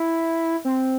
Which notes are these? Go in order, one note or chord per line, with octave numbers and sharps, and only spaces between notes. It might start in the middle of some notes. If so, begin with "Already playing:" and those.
Already playing: E4
C4